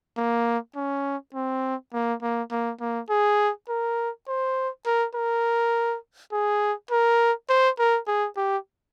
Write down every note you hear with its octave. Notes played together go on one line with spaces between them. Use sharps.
A#3
C#4
C4
A#3
A#3
A#3
A#3
G#4
A#4
C5
A#4
A#4
G#4
A#4
C5
A#4
G#4
G4